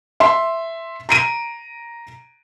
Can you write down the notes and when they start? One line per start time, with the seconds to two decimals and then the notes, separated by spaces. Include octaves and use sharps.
0.20 E5 C6
1.09 A#5 D7 D#7